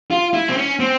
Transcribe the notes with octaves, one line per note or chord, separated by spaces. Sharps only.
F4
E4
C4
C#4
C4